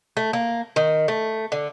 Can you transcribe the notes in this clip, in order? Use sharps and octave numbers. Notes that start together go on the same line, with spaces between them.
A3
A#3
D#3
A3
D3